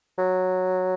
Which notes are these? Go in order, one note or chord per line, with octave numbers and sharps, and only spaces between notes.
F#3